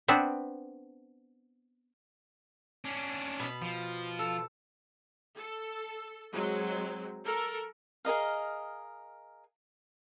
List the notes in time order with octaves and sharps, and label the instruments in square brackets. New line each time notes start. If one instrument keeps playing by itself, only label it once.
[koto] B3 C4 D4
[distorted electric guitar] C#4 D4
[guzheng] B2 B5
[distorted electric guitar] F3
[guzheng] A4
[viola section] A4
F#3 G#3 C4
A4 A#4
[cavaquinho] G#4 A#4 D#5 F5